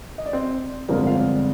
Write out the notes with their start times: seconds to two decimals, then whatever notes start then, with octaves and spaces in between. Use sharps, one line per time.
0.18 D#5
0.26 D5
0.33 C4 C5
0.88 G1 F2 D3 G#3 A#3 C4 A#4
1.07 F4 F5